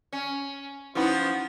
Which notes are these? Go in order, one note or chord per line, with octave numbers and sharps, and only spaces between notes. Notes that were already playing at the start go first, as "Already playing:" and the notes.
C#4
F3 F#3 B3 C#4 D#4 E4